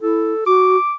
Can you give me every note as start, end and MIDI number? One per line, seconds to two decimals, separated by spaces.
0.02 0.33 64
0.02 0.42 69
0.47 0.77 66
0.47 0.94 86